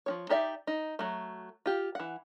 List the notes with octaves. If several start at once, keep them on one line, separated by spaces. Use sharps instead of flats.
F3 C#4 C#5
D#4 G4 D5 E5
D#4
F#3 A3
F4 G4
E3 F#5